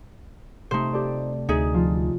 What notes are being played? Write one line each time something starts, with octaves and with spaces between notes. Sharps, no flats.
C3 A3 D#4 C5
G4 A4 D5
D2 D#4 G#4 E5
F3 F4